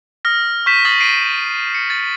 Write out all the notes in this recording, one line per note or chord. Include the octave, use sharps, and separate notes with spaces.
D#6 F6 A#6
C#6 G6 B6 E7
C#6 D#6 A6 C7 F#7
C#6 C7 D7 D#7
C#7
A6